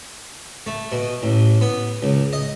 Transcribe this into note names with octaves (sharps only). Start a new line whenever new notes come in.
A3
B2
A1
B3
C#2
D#5